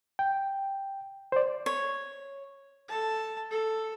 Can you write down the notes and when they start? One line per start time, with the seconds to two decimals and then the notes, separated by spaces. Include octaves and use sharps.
0.19 G5
1.32 C5 D5
1.66 C#5
2.89 A4 A5
3.50 A4